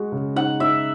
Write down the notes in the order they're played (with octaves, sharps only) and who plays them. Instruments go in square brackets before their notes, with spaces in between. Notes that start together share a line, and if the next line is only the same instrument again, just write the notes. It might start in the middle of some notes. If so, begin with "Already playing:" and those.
Already playing: [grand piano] G#3 F#4
C#3
[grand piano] D#4 [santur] F#5
[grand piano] D#4 [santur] E5